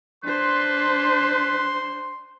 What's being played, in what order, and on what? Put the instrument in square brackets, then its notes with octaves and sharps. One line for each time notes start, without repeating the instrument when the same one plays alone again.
[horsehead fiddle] D4 C5 [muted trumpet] B4 [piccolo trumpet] C6